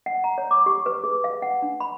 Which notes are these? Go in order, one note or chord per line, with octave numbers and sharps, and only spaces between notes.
F#5
A#5
C#5
D6
G4
B4
G#4
F5
F#5
D4
B5